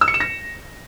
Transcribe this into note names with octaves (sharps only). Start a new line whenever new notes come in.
E6
C#7
E7
A#6